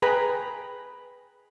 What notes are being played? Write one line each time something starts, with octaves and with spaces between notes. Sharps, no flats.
G#4 B4 G5 A#5 B5